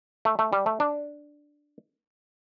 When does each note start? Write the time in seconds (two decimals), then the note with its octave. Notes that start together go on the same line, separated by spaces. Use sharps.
0.25 A3
0.39 A3
0.53 G3
0.66 A3
0.80 D4